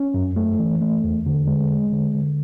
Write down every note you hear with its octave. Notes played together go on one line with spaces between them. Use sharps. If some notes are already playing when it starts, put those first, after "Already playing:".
Already playing: C#4
F#2
A3
E3
A3
E2
D3
G#3
G#3
D3
D3